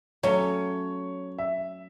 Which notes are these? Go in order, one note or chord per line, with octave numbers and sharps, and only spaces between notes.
F#3 A3 C#4 C#5
E5